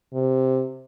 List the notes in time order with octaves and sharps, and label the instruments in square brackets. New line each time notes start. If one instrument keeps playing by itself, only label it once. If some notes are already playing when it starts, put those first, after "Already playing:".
[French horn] C3